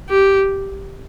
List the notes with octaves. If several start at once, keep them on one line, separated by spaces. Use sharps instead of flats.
G4